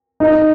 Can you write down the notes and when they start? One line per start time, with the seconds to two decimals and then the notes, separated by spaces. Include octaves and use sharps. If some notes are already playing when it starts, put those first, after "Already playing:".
0.20 D#4